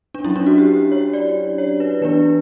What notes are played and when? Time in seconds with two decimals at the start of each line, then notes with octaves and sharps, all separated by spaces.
0.15 D4
0.24 F#3 C#4 E4
0.36 D4
0.47 F#4
0.58 G4
0.92 C#5
1.13 D5
1.58 C#5
1.80 B4
2.02 E3 B3 D4 B4